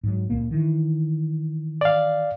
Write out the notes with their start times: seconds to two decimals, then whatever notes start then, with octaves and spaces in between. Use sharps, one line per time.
0.04 G#2 F#3
0.30 C#2 A#2 A#3
0.51 D#3 E3
1.81 D5 F5